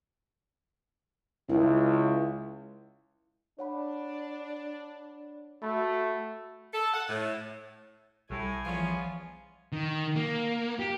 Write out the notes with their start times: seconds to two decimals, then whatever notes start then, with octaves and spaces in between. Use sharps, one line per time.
1.49 C#2 E4
3.59 D4 C#5 F#5 B5
5.62 A3 F#4 B5 A6
6.73 A4
6.94 F#5
7.09 A2
8.30 B1 A2 G3 G#5
8.65 E2 F3 B3 C#4 F4
9.72 D#3
10.16 A#3
10.79 G4